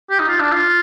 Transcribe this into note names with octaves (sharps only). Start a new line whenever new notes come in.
G4
D#4
F4
D4
F4